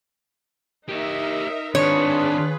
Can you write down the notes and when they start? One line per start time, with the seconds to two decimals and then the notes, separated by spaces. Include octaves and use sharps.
0.89 D#4 G4 A#4 C#5 E5
1.75 D#3 C4 D4 F4 G#4 B4 C#5